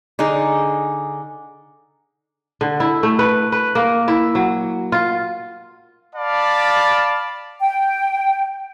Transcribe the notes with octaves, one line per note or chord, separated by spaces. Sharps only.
D3 D#4 G#4
D3
E4
A3
B4
B4
A#3
E4
F#3
F4
D5 F5 A5 B5
G5